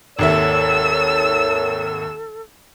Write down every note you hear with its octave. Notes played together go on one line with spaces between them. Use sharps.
G#1 D#2 A4 A#4 C#5 E5 E6